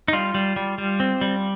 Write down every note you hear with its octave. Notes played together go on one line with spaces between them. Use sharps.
D#4
G3 F4
G3
G3
G3
C4
G3